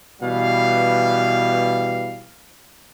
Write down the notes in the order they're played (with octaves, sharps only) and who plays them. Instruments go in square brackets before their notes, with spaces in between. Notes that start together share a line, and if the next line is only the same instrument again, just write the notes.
[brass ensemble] B2 E3 G3 F5